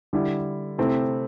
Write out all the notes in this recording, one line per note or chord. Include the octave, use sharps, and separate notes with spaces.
D3 G3 E4
C3 A3 C4 E4